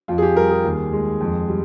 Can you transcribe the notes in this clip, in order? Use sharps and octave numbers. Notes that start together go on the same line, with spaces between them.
F2 F4
G#4
G4
G3 A#4
G#4
D#2
G#3
F2
G3